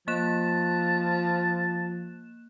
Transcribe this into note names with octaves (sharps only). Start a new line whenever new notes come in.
F3 A#3 A5 F#6 E7